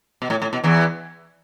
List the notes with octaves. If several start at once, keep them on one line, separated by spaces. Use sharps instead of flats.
B2
A2
A2
B2
E2 E3